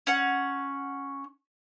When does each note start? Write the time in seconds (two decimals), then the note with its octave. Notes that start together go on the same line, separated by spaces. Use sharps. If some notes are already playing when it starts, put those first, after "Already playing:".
0.07 C#4 F#5